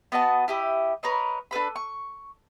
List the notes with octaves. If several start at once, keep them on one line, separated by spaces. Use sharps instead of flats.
B3 F#4 D#5 A5
E4 G4 D#5
A#4 B4 C#5 D#5
D4 A4 B4 B5
C#6